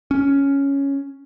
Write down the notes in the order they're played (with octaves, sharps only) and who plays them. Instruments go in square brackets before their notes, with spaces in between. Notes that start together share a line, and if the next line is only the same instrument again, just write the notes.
[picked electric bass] C#4